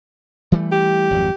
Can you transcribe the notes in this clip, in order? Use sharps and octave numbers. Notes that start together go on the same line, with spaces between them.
E3 G3 A3
G4
G#1 F2 F#3